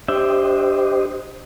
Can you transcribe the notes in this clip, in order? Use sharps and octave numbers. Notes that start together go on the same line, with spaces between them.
D4 G4 C5 D#5 E5 G5